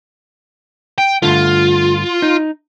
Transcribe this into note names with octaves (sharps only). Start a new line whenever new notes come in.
G5
G2 D3 A3 F4
D#4